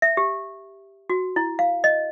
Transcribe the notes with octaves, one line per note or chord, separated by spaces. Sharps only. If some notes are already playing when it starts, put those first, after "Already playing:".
E5
G4
F#4
E4
F5
D#5